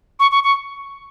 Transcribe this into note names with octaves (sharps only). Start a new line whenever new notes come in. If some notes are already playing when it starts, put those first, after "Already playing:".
C#6
C#6
C#6